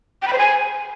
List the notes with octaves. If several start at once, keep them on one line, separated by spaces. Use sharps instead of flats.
G5
B5
C5
G#5